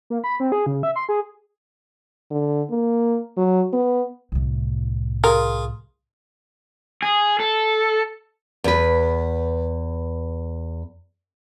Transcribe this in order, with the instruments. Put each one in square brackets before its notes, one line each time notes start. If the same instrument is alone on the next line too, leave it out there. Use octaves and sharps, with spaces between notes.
[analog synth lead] A#3
B5
C4
G#4
C#3
E5
C6
G#4
[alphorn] D3
A#3
F#3
B3
[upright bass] C2 A2
[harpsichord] F4 G#4 [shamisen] A#4
[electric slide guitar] G#4
A4
[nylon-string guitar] E2 B4